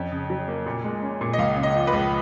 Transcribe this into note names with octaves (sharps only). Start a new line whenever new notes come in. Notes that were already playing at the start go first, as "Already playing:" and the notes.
Already playing: F2 C#4
C#3
F#3
A#3
A#2
G#3
C#4
A#2
D#5
C#2 F5
C#3
D#5
F3
B4
C#2